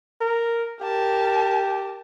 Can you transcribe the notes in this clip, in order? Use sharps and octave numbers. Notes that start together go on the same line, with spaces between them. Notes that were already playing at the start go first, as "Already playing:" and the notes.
A#4
G4 A#4 A5